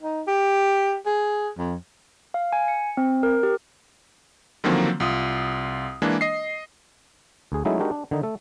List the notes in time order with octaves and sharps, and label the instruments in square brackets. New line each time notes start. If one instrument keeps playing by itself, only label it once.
[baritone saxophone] D#4
G4
G#4
F2
[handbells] F5
G#5
C#7
C4
A#4
G4
[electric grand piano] D3 D#3 F3 F#3 A#3 C4
C2 F4 D#6
E3 G#3 A#3 D4
D#5 C7
[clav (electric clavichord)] D2 G#4
F#3 G#3 A3 C#4 D#4 E4
G#3 D4 D#4 F#4 G4 A#4
D4
D3 D#3 D#4
A3 A4